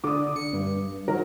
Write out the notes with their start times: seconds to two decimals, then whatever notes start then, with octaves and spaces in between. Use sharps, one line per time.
0.04 D3 D6 D#6
0.36 C#7
0.53 G2
1.08 D#3 F#3 A#4